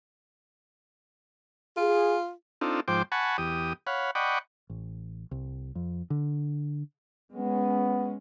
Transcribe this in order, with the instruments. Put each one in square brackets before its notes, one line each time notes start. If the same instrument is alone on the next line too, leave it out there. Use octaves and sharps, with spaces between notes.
[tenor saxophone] F4 [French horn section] G#4
[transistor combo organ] C4 D4 D#4 F4 A4
G#2 F3 C5 G5 D6
F#5 G#5 A5 B5 C#6
E2 G4 D#6
C#5 F5 F#5 B5
D5 D#5 F#5 G5 B5 C#6
[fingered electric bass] A1
C2
F2
D3
[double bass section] G#3 C#4 [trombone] B3